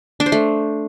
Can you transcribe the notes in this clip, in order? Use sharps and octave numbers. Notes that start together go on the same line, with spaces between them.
D4
C5
A3